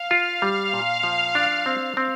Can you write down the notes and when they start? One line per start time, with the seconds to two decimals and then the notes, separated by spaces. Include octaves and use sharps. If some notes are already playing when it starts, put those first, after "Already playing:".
Already playing: F5
0.11 F4
0.42 G3
0.73 A#2
1.03 F3
1.35 D4
1.66 C4
1.97 C4